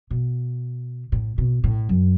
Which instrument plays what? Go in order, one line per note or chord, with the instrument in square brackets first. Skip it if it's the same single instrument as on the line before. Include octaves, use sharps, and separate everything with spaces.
[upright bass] B2
A2
B2
A2
F#2